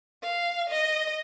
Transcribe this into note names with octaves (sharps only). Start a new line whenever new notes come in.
F5
D#5